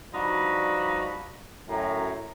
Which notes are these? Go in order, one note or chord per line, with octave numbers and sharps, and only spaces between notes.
G2 F3 D4 D#4 F#4 B5
F#2 A2 A#5